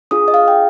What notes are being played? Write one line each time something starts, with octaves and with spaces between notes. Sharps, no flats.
D4 F4 G#4 D#6
D#5
F5
G5